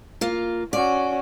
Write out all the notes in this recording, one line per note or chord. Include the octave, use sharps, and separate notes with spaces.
A#3 F4
C#4 F#4 D5